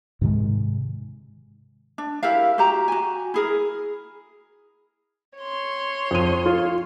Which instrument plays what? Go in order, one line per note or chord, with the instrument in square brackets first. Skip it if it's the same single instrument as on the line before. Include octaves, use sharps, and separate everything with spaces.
[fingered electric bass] G#2 C3 D#3 G#3
[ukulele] D4
E4 G4 A#4 F5
F#4 G4 A#5
F#4 G#5
E4 G#4 A#4
[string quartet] C#5 C6
[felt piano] F2 D#7
F4